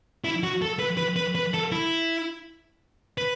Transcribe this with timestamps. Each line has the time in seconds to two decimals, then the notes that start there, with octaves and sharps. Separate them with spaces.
0.24 E4
0.43 F#4
0.62 A4
0.79 B4
0.97 B4
1.16 B4
1.35 B4
1.54 A4
1.72 E4
3.18 B4